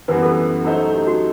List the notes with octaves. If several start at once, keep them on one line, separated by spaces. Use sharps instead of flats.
F#2 E3 G3 B3 F#4 B4
A4
F#3 A3 D#4 A4 C5
G4
F#4